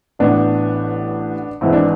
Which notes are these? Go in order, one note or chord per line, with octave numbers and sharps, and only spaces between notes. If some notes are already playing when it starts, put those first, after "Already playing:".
A1 A2 E3 B3 D4
G#1 G#2 E3 E4
D4